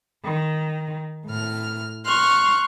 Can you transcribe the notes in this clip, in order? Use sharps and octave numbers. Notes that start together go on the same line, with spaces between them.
D#3
A2 F6
C6 C#6 F6 F#6